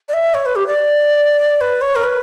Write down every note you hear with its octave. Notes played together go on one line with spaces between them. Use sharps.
D5
E5
C#5
B4
G4
D5
B4
C#5
A#4
B4